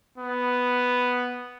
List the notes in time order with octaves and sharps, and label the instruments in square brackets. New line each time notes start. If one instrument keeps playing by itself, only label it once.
[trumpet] B3